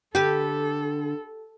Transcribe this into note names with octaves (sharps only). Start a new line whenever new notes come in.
D3 G4 A4 B4